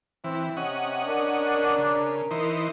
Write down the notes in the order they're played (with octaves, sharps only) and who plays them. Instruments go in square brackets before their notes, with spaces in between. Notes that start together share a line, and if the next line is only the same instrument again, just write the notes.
[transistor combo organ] E3 [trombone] C4
[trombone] C3 [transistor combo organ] C#4 D#5 F#5
[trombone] D4 [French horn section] A#4
[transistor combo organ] C#3
E3 D#4 C5